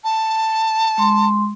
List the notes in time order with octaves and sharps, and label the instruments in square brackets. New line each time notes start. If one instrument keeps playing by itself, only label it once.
[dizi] A5
[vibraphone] G#3 C6